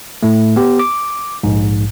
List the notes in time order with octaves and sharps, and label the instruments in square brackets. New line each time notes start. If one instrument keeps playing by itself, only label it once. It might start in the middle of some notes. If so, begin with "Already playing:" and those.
[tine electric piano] A2 A3
B3 G4
D6
A#1 G#2